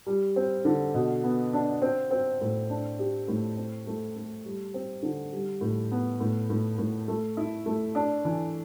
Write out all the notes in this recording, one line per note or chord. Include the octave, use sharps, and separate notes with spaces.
G3
C4
D3
B2
B3
D4
C4
C4
A2
D4
G4
A2
C4
A3
A3
G3
C4
D3
G3
A2
B3
A2
A2
A2
A3
E4
A3
D4
E3